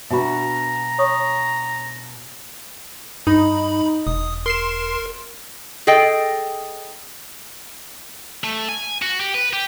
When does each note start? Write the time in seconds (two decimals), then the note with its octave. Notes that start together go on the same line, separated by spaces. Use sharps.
0.10 B2 D4 F#4 E5 A#5 B5
0.98 C#5 C#6 D#6
3.27 G2 D#4 B5
4.07 E1 D#6
4.46 A#4 C6 C7 E7
5.87 G#4 A4 D#5 G5
8.44 A3
8.69 G#5
9.02 F#4
9.21 G4
9.34 B4
9.53 G4